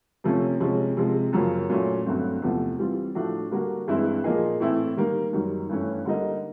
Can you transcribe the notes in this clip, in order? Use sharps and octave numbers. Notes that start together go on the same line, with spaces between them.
C3 F3 A3 C#4
C3 F3 G#3 C#4
C3 F3 G#3
F#2 C#3 F3 A#3 C#4
A#2 F#3 A3 C#4 F#4
G2 D3 F#3 A3 C4
E2 C3 F3 A3
E3 G3 C4 F4
A2 F3 A3 D4 F#4
D3 G3 A#3 D4 F#4
G2 E3 G#3 C4 E4
A#2 F3 A#3 D#4 G#4
A2 E3 A3 C4 E4
D#3 G3 A#3
F#2 D#3 G3
G2 E3 A3 C#4
D3 G3 A#3 D#4